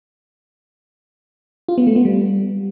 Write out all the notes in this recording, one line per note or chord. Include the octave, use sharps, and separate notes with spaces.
F4
B3
A3
B3
G3